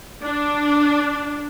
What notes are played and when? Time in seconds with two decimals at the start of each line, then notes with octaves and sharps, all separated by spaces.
0.24 D4